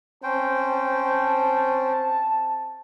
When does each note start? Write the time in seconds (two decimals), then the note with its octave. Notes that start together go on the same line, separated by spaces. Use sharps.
0.23 C4 C#4 C5 G5 A5